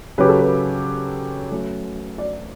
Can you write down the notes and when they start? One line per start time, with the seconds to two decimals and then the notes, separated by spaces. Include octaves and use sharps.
0.18 C#3 F#3 C#4 G4 B4
0.28 A4
0.39 B4
1.51 F#3 A3 C#4
2.18 D5